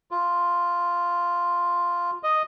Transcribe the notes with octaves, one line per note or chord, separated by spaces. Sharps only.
F4
D#5